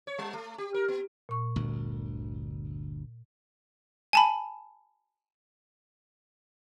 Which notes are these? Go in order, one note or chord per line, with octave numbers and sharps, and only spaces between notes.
C#5
G3
A3
G4
A#4
B3
A#2 C#6
G1 D2
G#5 A5 B5